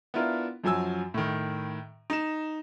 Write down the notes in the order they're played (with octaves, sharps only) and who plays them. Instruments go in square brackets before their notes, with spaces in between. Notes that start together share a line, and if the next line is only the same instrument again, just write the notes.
[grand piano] B3 D4 E4 F4 A#4
F#2 F3 F#3 G#5 E6
A2 D#3
D#4 E7